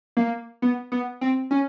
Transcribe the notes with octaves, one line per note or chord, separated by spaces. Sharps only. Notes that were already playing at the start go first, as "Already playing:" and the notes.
A#3
B3
B3
C4
C#4